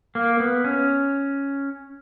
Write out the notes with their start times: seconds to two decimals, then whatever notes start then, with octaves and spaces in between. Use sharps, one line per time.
0.15 A#3
0.40 B3
0.64 C#4